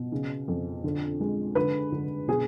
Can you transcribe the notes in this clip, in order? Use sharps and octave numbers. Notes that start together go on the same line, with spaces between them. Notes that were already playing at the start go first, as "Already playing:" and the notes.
Already playing: B2
C#3
F2
D3
G#3
D3 B4
D3
B2 G#4